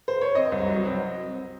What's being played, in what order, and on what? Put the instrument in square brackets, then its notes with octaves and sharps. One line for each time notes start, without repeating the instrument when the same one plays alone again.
[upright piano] C5
C#5
C4 D#5
C2
F#3
C4